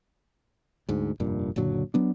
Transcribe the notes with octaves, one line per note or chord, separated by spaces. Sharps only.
D2 G#2
F1 G2 A#2
F#1 A#2 D3 F#3
F#3 B3 D4